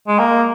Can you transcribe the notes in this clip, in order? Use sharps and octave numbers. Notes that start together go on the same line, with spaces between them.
G#3
A#3